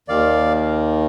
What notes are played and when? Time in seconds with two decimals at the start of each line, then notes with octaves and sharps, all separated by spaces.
0.08 D#2 D#3 D5 F5